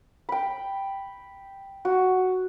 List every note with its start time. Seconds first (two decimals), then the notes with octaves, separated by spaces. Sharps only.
0.29 G5 B5
1.85 F#4